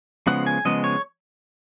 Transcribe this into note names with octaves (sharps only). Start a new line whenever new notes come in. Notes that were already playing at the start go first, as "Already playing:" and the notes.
C#3 F3 G#3 B3 F#5
G#5
C#3 F3 G#3 B3 D#5
C#5